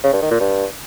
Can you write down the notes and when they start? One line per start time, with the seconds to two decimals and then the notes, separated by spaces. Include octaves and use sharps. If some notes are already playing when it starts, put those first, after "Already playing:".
0.04 C#3
0.13 G2
0.22 D#3
0.31 A#2
0.40 G2